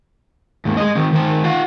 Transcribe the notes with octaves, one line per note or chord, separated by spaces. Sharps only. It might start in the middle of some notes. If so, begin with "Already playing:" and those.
D#2 G#2
G#3 D#5
D#3 C4
D#3 C5
F4 F#5